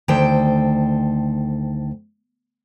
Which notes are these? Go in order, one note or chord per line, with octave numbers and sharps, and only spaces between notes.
D2 D#3 A4 C5 G5